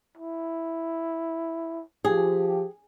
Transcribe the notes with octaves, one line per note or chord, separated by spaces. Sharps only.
E4
F3 G4 G#4